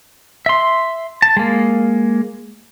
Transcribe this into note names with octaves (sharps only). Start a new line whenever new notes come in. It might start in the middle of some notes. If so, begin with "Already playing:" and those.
E5 C6
A5
G#3 A#3